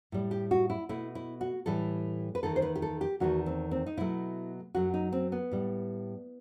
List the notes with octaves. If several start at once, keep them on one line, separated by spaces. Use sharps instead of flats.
A2 G3
G4
F#4
E4
B2 A3 E4
E4
F#4
A2 E3 G3 A4
B4
E2 D#3 A3 A4
C5
B4
G4
A4
G4
E2 D#3 A3 F#4
C4
C4
D#4
B2 F#3 A3 E4
F#2 F#3 A3 F#4
D#4
C4
B3
A2 G3